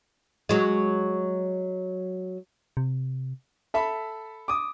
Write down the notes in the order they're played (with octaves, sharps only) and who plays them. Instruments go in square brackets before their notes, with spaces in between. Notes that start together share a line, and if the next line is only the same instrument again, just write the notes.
[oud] F#3 G#3
[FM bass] C3
[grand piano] A4 E5 B5
D6 D#6